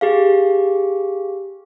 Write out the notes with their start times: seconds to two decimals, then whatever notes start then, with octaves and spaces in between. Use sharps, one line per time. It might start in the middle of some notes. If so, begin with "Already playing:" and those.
0.01 G4 G#4 F5